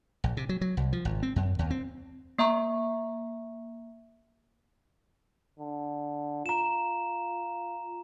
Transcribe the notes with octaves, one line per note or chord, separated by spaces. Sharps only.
A#1
C3
F#3
F#3
C2
F3
G#1
C4
F#2
D#2
C4
A#3 E5 A#5 C#6
D3
F4 A#5 E7